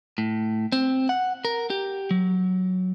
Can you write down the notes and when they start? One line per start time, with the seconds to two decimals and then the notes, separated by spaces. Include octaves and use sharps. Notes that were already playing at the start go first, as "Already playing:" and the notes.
0.18 A2
0.72 C4
1.09 F#5
1.45 A#4
1.70 G4
2.11 F#3